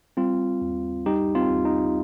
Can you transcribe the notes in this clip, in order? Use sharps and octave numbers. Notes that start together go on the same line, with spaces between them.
G3 C4 F4
D#2
G3 D#4 G4
C4 F4
D#2
D#4